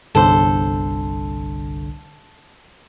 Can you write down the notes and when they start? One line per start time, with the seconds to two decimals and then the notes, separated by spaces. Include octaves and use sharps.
0.15 G1 C2 D3 A4 C5